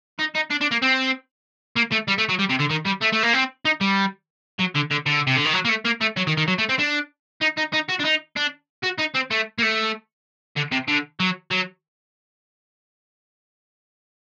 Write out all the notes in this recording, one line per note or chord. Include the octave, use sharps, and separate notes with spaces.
D#4
D#4
D4
D4
A#3
C4
A#3
A3
G3
A3
F#3
G3
C3
D3
D#3
G3
A3
A3
A#3
C4
D#4
G3
F#3
D3
D3
D3
C3
D3
D#3
F#3
A#3
A3
A#3
A3
F#3
D#3
D#3
F#3
A3
C4
D4
D#4
D#4
D#4
F#4
D4
D#4
D4
F#4
D#4
C4
A3
A#3
A3
D3
C3
D3
F#3
F#3